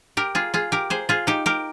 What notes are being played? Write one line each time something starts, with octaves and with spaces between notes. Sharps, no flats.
G4 A#4
F4 G#4
F4 G#4
G4 A#4
G#4 C5
F4 G#4
D#4 G4
G4 A#4